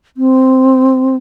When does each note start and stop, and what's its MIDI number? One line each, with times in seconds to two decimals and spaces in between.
0.17 1.16 60